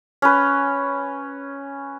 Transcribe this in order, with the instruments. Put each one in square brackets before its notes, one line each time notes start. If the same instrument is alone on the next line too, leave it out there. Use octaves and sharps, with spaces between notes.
[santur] C#4 B4